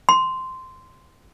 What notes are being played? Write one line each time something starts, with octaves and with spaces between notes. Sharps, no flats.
C6